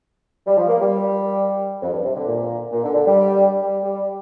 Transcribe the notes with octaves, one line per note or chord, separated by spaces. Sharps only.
G3
F3
A#3
G3
F2
G2
C3
D3
A#2
A#2
D3
D3
G3
G3
G3